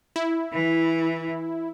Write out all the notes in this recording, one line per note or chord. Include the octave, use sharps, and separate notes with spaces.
E4
E3